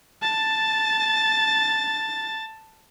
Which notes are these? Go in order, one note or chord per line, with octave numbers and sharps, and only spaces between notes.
A5 A6